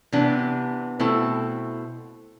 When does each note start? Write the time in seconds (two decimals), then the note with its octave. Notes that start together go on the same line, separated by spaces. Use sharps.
0.12 C3 E3 B3 D4
1.00 B2 A3 C4 E4 A4